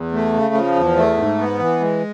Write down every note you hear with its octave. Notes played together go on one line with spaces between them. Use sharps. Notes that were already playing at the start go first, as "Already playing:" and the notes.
Already playing: E2
A3
C#3
F3
E2
A3
G#2
B3
E3
G#3